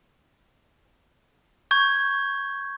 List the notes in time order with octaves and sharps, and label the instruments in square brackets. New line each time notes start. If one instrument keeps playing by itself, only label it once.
[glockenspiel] C#6 G6 G#6